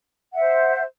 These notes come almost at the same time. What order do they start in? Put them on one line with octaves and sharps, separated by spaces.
F#5 E5 C5